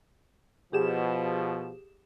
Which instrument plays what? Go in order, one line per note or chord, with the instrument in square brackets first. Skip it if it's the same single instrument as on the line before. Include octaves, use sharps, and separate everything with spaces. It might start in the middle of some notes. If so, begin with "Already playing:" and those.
[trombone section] B2 F3 [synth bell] G4 G#4 E7